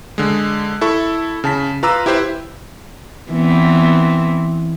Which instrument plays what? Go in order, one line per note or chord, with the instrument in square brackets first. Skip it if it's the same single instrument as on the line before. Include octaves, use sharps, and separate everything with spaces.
[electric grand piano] D3 G#3
E4 A4 B5 C#6
C#3 A5 B6
F4 B4 A#5 D6 E6
E4 G4 B4 C5 E5
[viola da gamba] E3 B3 C4